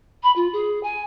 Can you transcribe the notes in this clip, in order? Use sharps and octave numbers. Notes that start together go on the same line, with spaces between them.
B5
F4
G#4
G#5